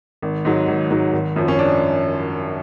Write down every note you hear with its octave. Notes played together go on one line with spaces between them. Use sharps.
G#1
G#2 F#3
G#1
G#2 F#3
G#1
F#2 F3
C#4
D4